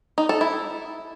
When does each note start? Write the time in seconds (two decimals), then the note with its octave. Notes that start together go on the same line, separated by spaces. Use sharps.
0.18 D#4
0.29 A4
0.41 E4